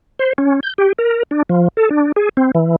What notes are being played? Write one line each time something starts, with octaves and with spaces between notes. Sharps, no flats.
C5
C#4
G6
G4
A#4
D4
F3
A4
D4
G#4
C4
E3